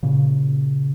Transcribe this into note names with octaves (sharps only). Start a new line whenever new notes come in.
A#2 C#3